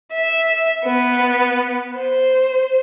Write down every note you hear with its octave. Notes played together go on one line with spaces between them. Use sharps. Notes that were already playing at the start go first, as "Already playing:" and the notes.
E5
B3
C5